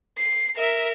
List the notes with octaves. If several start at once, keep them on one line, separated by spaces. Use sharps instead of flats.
C7
A#4 E5